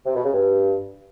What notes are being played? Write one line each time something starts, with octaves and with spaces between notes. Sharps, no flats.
C3
B2
C#3
G2